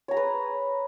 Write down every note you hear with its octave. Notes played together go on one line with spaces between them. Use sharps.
G#4 B4 C#5 A#5